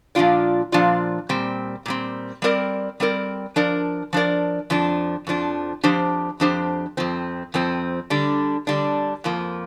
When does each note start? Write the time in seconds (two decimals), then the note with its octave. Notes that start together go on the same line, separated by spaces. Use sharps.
0.15 A#2 F3 D4 F4 D5
0.72 A#2 F3 D4 F4 D5
1.29 A#2 G3 C4
1.86 A#2 G3 C4
2.42 G3 C4 A#4 D5
3.00 G3 C4 A#4 D5
3.56 F3 D4 A#4 D5
4.13 F3 D4 A#4 D5
4.70 F2 F3 D4
5.27 F2 F3 D4
5.83 F2 F3 D4 G4 C5
6.40 F2 F3 D4 G4 C5
6.97 F2 F3 C4
7.54 F2 F3 C4
8.10 D3 G3 D4
8.67 D3 G3 D4
9.24 F2 F3 A#3